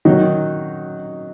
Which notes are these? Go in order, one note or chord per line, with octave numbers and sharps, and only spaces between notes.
D#3 F#3 D#4